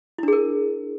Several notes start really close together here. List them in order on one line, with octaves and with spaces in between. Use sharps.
E4 D4 G#4 A#4